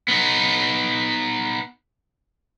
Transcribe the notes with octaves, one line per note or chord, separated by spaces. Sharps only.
B3 D#4